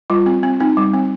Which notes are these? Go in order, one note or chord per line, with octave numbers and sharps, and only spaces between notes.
G3 F4
C4
C4
C4 D#4
G3
C4